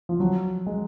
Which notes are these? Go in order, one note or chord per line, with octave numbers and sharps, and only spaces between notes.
F3
F#3
G#3